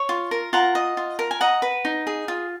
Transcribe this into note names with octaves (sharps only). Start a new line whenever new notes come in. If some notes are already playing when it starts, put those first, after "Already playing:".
Already playing: C#5
F4
A#4
F4 F#5 A#5
D#5
F4
A#4
G#5
D#5 F#5 A#5
B4
D#4
G#4
F4